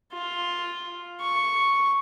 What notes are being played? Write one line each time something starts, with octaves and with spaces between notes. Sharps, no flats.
F4
C#6